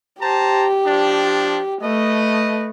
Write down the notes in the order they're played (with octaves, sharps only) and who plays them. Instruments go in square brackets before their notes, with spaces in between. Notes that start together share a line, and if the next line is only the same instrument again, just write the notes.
[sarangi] G4 [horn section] C5 A5 A#5
[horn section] F3 D4
[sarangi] A3 [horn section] B4 D#5